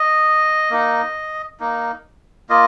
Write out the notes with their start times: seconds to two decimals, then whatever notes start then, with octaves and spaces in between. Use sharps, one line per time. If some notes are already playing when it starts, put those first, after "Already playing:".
Already playing: D#5
0.71 A#3 D#4
1.60 A#3 D#4
2.49 A#3 F4 D#5